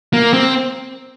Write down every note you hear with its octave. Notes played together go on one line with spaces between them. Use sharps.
A#3
C4